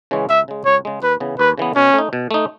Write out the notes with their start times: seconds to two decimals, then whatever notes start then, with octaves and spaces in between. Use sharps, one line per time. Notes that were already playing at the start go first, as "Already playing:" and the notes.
0.11 C#3 E3 G#3 C#4
0.29 C#2 E5
0.48 C#3 G#3
0.65 C#2 C#5
0.85 C#3 G#3
1.03 D#2 B4
1.20 C#3 E3 B3
1.39 D#2 B4
1.58 C#3 E3 B3
1.76 B2 C#4
1.94 A3 D#4
2.13 B2
2.31 A3 D#4